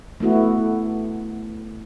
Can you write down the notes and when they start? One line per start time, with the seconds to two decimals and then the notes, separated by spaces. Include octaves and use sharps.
0.20 A3 B3 E4 F#4